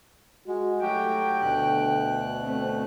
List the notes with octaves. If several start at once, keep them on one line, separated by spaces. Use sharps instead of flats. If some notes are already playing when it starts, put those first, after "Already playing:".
G#3 F#4
F#3 A3 F#4 G4 G5
D2 B2 D3 F#6
A3 C4